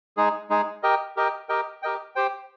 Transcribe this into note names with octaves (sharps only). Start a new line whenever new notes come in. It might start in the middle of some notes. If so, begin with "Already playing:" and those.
G#3 D#4 G#4
G#3 D#4 G#4
G4 A#4 D#5 G5
G4 A#4 D#5 G5
G4 A#4 D#5 G5
G4 A#4 D#5 G5
G4 C5 G5